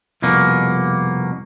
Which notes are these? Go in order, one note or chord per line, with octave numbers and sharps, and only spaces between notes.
C2 F2 B2 A#3